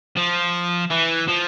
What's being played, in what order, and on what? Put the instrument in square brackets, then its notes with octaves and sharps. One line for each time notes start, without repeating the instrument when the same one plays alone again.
[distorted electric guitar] F3
E3
F3